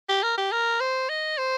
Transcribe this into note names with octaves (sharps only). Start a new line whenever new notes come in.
G4
A#4
G4
A#4
C5
D#5
C5